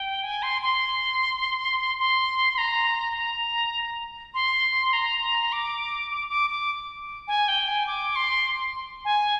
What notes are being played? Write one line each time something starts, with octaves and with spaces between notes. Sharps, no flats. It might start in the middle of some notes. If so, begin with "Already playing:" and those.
Already playing: G5
G#5
C6
C6
C6
C6
A#5
A#5
C6
A#5
D6
D6
D6
D6
G#5
G5
G#5
D6
C6
G#5